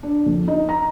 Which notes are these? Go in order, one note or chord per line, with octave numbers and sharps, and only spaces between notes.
D4
F2
D#4
A#5